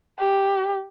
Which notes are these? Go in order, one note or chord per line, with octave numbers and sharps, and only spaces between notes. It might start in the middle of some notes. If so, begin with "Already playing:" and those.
G4